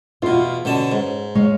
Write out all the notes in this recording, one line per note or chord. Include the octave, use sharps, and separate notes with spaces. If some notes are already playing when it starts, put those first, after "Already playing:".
E2 B2 B3 F4
B2 D3 C#4 A5
G#2
G#3 C#5 F5